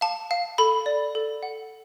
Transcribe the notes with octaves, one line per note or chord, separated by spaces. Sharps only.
F5 A5
F5
A4 B5
D5
A4
F#5